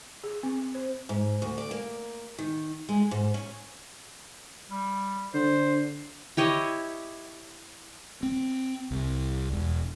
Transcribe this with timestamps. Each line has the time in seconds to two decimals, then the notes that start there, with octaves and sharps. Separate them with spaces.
0.24 G#4
0.43 C4
0.75 C5
1.09 G#2
1.42 D2
1.58 D5
1.71 A#3
2.39 D#3
2.89 G#3
3.11 G#2
3.34 C#4
4.69 G3
5.34 D3 C5
6.37 E4 G4 C#5 D#5
8.23 C4
8.91 C2
9.53 E1